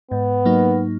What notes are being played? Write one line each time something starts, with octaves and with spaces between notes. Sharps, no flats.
G#2 B3
F#3 A#3 D#4